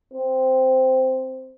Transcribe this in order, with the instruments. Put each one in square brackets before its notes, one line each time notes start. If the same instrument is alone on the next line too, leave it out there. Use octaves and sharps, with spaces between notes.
[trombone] C4